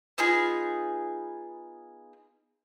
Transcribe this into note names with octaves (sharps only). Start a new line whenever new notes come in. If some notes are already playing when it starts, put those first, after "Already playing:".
B3 D#4 F4 G#4